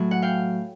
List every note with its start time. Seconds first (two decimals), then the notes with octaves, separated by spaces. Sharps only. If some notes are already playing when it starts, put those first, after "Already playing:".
Already playing: A2 F#3
0.11 F#5
0.22 F5 G5